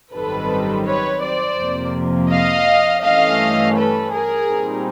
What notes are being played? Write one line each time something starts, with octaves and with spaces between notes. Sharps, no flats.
G#1 F#2 D#3 G3 C4 A4 B4
B4 C#5
C5 D5
F2 C3 F3 A#3
D#5 F5
G2 E3 A3 C#4 D#5 F5
A4 B4
G#4 A#4
A#2 G3 C4 D#4